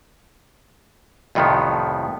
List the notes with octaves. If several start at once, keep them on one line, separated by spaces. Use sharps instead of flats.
C2 F2 A2 D#3 F3 B3